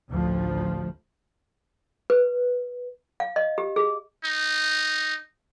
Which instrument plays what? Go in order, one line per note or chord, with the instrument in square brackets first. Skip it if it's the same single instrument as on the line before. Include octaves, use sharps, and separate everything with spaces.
[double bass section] A1 D2 F3
[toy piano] B4
F5
D#5
G4
G#4
[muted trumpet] D#4